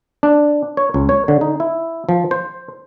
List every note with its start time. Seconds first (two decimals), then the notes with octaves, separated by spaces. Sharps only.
0.23 D4
0.77 C#5
0.94 C#2
1.09 C#5
1.28 D3
1.41 D#4
1.60 E4
2.09 F3
2.31 C5